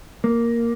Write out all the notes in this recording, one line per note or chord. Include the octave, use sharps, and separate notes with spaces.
A#3